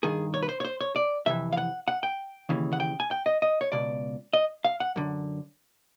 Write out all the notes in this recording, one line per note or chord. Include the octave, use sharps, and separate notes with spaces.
G2 D#3 G#4
C#5
B4
C5
C#5
C5
C#5
D5
F2 C3 E3 E5
F5
F#5
F#5
G5
D#2 C#3 E3
F#5
G5
G#5
G5
D#5
D#5
C#5
C#2 B2 D5
D#5
F5
F#5
F#2 D3